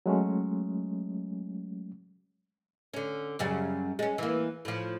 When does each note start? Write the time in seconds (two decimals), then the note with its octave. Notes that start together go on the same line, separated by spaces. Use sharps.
0.06 F#3 G#3 A3 C#4
2.94 D3 C#4
3.39 F#2 C#3 G3
3.99 G#3 C#4
4.18 E3 A#3
4.65 A2 F3